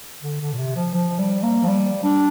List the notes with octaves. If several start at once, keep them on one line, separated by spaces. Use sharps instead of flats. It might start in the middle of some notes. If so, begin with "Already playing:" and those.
D3
D3
A#2
C3
F3
F3
G3
A#3
F3
G3
D4